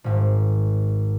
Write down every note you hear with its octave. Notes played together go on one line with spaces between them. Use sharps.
G#1 G#2